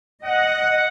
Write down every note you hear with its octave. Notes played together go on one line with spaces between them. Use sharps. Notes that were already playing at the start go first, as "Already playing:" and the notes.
D#5 F#5